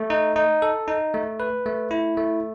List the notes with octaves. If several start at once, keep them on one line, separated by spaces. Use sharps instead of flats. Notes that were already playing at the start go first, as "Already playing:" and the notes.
Already playing: A3
D#4
D#4
A4
D#4
A3
B4
A3
E4
A3